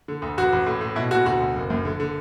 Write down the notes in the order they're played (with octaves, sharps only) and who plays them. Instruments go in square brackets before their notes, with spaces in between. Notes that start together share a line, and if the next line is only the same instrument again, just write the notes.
[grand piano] D3
D2
A1 F#4
A1
A2
A2
B2 E4
B2 F#4
D2 F#4
D2
F#1
F#2
D3
D3